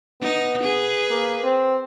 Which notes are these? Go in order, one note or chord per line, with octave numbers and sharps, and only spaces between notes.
B3 D#4
G#4 B4
A#3
C4